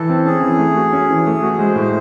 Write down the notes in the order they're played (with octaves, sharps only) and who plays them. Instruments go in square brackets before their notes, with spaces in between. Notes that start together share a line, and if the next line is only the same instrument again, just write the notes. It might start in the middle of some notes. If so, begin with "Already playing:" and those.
Already playing: [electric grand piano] E3 [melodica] A4
[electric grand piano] C4
[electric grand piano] C#4 [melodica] G#4
[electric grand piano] E3
A3
F#4
C#4
E3
A3
F#4
[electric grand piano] G#3 [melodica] C5
[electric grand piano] A2